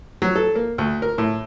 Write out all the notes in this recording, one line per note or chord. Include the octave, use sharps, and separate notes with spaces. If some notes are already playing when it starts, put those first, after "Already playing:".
F#3
A4
A#3
D2
A#4
A2